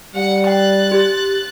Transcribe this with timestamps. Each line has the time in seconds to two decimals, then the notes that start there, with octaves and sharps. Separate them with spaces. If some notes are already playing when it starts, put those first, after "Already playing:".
0.15 G3 F#5 C#7
0.47 G5 F#6 A6
0.92 G4